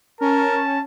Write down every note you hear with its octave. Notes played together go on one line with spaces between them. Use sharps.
C#4 A#4 A5